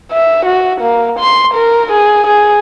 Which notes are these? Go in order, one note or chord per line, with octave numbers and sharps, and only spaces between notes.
E5
F#4
A#3
C6
A#4
G#4
G#4